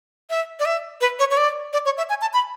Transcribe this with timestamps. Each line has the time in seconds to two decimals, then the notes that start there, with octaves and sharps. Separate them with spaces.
0.30 E5
0.60 D5
0.65 E5
1.01 B4
1.19 C#5
1.31 C#5
1.37 D5
1.73 D5
1.85 C#5
1.98 E5
2.09 G#5
2.21 A5
2.33 B5